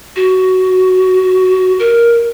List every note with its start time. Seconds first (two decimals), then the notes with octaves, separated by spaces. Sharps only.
0.16 F#4
1.79 A#4